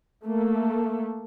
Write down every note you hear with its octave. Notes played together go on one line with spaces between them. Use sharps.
A3 A#3